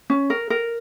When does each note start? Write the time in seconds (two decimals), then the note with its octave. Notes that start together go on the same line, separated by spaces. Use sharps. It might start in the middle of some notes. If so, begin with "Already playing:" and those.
0.10 C#4
0.30 A#4
0.50 A#4